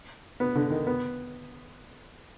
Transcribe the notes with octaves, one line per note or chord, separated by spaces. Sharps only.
B3
D3
D#3
B3